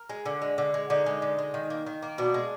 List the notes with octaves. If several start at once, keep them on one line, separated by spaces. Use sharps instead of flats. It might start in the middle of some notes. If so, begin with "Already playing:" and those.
Already playing: A#4
G#3
D3
G#3
D3
G#3
D3 D#4
G#3
D3
G#3
D#3
A#3
D#3
A#3
B2 D4
G#3